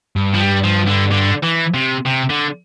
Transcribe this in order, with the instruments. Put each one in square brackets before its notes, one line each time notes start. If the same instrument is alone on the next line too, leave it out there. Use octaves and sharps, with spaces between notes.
[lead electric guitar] G2
[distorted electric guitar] F3
G3
F3
D3
D3
E3
C3
C3
D3